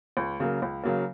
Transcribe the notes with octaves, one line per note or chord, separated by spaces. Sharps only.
C#2
C#3 F#3 A#3
C#2
C#3 F#3 A#3